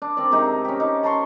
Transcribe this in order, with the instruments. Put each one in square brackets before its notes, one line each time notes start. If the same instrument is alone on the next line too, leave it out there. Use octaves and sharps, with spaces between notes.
[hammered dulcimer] D4
C4 A#4 D5
C3 G#3 D#4
C#4 G4
D#4
A5 A#5 C6 C#6